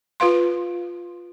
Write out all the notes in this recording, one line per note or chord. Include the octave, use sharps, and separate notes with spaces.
F4 B4 F5 C6